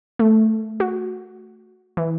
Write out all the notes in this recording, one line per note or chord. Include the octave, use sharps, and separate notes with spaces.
A3
F#4
E3